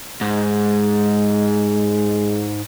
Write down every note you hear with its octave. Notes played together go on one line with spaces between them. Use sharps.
G#2 G#3